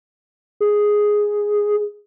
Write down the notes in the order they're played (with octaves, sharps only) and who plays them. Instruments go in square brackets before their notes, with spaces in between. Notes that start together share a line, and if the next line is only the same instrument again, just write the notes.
[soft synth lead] G#4